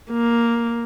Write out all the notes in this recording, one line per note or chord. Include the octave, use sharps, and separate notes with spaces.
A#3